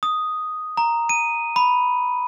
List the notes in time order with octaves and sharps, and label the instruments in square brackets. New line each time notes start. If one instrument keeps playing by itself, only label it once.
[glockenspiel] D#6
A#5
D#7
B5